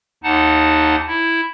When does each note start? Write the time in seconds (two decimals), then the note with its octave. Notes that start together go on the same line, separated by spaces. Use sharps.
0.24 D#2 D#4 F#5 A5
1.07 E4